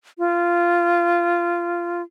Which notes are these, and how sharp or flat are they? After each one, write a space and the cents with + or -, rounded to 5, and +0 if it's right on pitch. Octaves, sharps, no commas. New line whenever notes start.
F4 -15